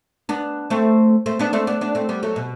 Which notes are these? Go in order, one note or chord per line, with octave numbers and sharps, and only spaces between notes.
B3 D4
A3 C4
A3 C4
B3 D4
A3 C4
B3 D4
B3 D4
A3 C4
G3 B3
F#3 A3
B2